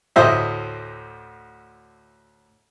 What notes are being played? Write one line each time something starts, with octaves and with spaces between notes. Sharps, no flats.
D2 A2 C5 D#5 E5